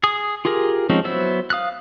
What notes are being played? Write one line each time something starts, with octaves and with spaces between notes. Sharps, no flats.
G#4 D#6
F4 G4 G#4 A#4
F3 G#3 C4 C#4 D#4
F#3 B3 E4 C5 E6
F5 D#6 F6 F#6